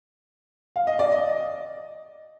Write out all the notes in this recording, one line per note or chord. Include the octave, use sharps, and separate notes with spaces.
F5
D#5
D5
D#5